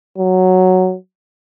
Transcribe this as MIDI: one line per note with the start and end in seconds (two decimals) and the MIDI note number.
0.18 0.95 54